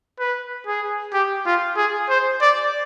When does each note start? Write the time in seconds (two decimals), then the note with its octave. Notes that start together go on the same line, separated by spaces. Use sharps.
0.19 B4
0.67 G#4
1.13 G4
1.46 F4
1.77 G#4
2.09 C5
2.41 D5